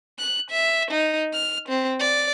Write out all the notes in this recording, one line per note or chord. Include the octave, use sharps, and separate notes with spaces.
F#6
E5
D#4
F6
C4
D5